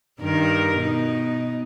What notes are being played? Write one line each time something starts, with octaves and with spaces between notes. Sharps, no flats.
G2 D#3 A#4
B2 D#4